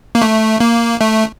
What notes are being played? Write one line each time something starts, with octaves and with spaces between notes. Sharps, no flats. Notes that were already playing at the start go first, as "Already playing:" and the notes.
A#3
A3
A#3
A3